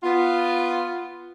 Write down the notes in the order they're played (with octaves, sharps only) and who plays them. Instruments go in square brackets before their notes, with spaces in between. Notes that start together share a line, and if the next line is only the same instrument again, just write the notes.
[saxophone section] B3 F4